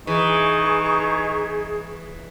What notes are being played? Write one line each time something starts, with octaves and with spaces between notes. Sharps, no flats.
E3 D#4 G#4 C#6